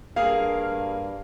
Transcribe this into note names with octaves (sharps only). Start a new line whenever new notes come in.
G2 A#3 G#4 A#4 F5